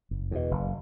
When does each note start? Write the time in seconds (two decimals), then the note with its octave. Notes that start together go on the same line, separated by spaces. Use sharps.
0.11 F#1
0.31 E2 B2
0.51 F#1